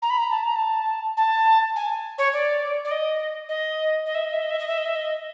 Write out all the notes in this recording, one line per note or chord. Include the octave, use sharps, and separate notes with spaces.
A#5
B5
A#5
A5
A#5
A5
A5
G#5
C#5
D5
D5
D#5
D#5
D#5
E5
D#5
E5
D#5
E5
D#5
E5
D#5
E5
D#5